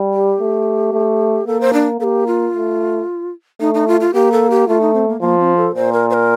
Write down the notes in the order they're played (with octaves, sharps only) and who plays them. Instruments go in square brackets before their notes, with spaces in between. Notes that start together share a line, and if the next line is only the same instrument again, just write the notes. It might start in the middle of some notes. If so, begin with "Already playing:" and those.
Already playing: [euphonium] G3
[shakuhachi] G4
[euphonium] A3
A3
[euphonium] A#3 [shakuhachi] A4
[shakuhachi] C5
D4
[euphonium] A#3 [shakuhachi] A4
[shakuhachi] G4
F4
[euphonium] A3
[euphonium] A3 [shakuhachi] D#4
[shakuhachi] D#4
F4
F4
[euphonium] A#3 [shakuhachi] G4
[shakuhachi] A4
G4
[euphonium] A3 [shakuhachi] F4
[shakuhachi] D#4
C4
A#3
[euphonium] F3 [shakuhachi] A#3
[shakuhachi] C4
A4
[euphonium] A#2 [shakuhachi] C5
[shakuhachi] A#4
C5
A#4